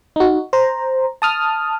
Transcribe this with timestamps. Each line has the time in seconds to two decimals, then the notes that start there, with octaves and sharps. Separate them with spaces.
0.16 D#4 F#4
0.53 C5 A#5
1.22 A5 D#6 F6